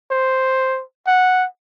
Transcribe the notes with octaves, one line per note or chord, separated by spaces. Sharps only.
C5
F#5